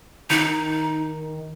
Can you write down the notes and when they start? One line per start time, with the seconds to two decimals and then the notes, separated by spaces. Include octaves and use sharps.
0.30 D#3 D#4